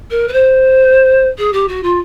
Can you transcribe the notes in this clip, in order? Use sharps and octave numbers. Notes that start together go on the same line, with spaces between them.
A#4
B4
C5
G#4
G4
F#4
F4